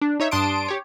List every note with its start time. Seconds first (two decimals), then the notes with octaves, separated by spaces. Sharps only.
0.02 D4
0.20 D#4 C#5 E5
0.31 G2 D4 A5 C6 D#6 D7
0.68 G4 C#5